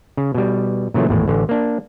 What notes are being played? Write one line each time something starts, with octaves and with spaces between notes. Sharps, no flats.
C#3
B2 G3
A#2 C#3 E3 F#3 A3
G#1 E2 A2
A1 D3
A#3 D4